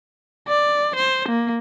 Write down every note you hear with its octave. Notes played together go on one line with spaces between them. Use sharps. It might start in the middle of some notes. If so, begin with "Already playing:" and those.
D5
C5
A#3